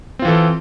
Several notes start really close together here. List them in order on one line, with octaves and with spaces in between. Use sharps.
C4 F4 E3 A4